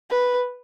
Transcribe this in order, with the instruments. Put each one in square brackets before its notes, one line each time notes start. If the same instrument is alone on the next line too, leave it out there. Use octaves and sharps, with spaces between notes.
[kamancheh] B4